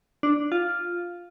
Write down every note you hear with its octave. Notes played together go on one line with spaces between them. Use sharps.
D4
F4